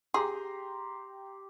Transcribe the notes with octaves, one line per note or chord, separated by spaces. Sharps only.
G4 G#4 G5 A#5 C6